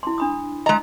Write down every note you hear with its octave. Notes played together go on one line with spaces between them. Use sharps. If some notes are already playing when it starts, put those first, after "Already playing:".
E4 C6
D4 B5 D#6
G#3 D#5 A#5